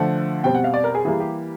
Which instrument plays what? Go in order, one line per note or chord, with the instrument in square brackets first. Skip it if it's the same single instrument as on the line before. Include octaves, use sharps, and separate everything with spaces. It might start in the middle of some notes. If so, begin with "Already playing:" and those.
Already playing: [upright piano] D3 F3 A3 F#5
B2 G3 C4 G5
F#5
F5
D5
A#4
G#4
E3 G3 A#3 G#4
G4